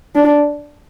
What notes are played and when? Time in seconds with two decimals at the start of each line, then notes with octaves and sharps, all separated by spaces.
0.15 D4